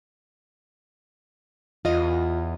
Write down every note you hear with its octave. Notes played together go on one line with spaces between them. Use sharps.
E2 F4 D#5